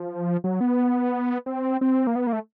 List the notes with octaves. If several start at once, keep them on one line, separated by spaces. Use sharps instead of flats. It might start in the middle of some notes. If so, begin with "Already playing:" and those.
Already playing: F3
F#3
B3
C4
C4
A#3
B3
A#3
A3